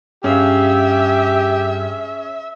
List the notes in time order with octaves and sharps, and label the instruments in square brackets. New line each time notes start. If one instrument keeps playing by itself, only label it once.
[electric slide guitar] G2 F5 [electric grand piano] C#4 G#4 [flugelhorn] G4 [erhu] E5